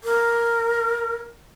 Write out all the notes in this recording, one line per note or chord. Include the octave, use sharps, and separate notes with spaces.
A#4